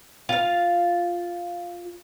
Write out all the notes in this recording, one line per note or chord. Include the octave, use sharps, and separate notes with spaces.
F4 F5